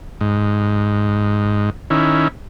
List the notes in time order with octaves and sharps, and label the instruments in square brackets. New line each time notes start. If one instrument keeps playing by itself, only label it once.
[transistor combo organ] G#2
D#3 C#4 E4